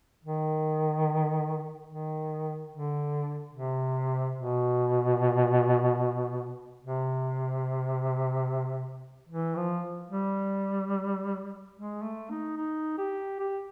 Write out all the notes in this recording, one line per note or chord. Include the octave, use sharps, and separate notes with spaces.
D#3
D#3
D3
C3
B2
C3
E3
F3
G3
G#3
A3
D#4
D#4
G4
G4